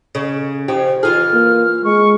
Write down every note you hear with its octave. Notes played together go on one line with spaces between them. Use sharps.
C#3
C#3 F3 G4
E3 F4 G#4 F6
A#3
G#3 C#6